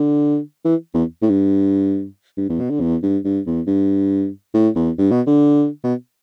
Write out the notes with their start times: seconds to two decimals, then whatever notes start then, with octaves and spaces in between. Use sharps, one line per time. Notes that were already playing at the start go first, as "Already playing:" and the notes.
Already playing: D3
0.65 E3
0.94 E2
1.22 A2
1.30 G2
2.37 G2
2.49 E2
2.60 B2
2.70 D3
2.81 E2
3.03 G2
3.25 G2
3.46 E2
3.67 G2
4.54 A2
4.75 E2
4.98 G2
5.11 B2
5.27 D3
5.84 B2